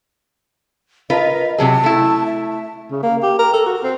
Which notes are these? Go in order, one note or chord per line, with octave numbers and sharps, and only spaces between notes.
F4 A#4 B4 D#5
C3 F#3 G#4 A5
A3 E4
E5
C#3
A#3
G4
A#4
A4
F#4
C4